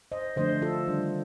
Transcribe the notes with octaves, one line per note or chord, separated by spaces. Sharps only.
C5 D#5
D3 F3 A3 D4 C5 D#5
F4 A4
D#3 G3 D4